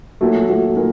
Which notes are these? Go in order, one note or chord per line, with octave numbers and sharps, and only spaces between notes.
A#2 F#3 A3
A#2 F#3 A3
A#2 A#4